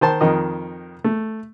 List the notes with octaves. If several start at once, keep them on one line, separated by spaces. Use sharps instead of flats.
D#3 C5 A5 C6
F2 D#3 D#5
A3